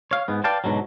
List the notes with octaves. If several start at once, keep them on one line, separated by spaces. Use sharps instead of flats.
C#5 F5
G#2 B3
B4 D5 F5 G5 A5
G#2 B2 D3 F#3